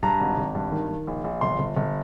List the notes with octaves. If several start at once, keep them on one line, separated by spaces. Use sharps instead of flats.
G2 A#5
G#1
G#1
G2
D#3
D#3
A#1
A#1
G1 C6
G1
G1